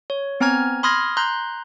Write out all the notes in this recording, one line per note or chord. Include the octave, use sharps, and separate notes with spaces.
C#5
B3 C4 G#5 A#5 F6 G#6
B5 C6 D#6 F6 G#6 A#6
A#5 C6 F#6 G6